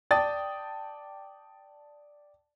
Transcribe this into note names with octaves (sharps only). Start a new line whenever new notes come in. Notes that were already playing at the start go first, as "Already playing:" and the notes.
D5 G5 A5 D#6 A6